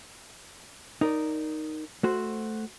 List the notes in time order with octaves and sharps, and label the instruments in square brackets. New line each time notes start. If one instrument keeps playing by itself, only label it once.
[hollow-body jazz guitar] D#4 A#4 D5
A3 F#4 C5